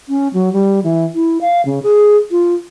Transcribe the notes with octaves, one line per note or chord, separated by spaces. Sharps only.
C#4
F#3
G3
E3
E4
F5
C#3
G#4
F4